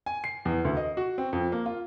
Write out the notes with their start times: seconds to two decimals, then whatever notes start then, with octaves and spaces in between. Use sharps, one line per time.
0.06 G#5
0.24 C7
0.45 E2
0.65 D2
0.77 D#5
0.97 F#4
1.18 C4
1.33 F2
1.52 A#3
1.66 F4